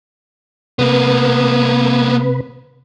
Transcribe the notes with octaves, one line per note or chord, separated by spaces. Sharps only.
C3 A#3 B3 B4